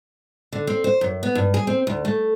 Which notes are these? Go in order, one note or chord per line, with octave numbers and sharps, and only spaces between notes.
D3
C4
C5
F#2
B3
G2
G#4
C4
D2
A3